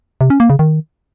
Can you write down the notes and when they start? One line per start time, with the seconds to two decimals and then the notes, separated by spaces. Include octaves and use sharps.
0.21 C3
0.30 C#4
0.40 A#3
0.50 C#3
0.59 D#3